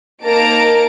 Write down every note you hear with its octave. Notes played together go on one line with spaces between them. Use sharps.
A#3 D#4 A5 A#5 D7